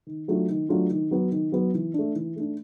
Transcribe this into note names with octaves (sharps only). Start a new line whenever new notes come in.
D#3
F#3 A3 D4 F4
D#3
F#3 A3 D4 F4
D#3
F#3 B3
D#3
F#3 B3
E3
A3 D4
E3
A3 D4